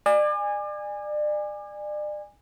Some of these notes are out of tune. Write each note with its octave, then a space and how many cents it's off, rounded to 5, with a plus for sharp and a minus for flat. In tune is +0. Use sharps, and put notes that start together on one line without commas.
D5 +35 G#5 -20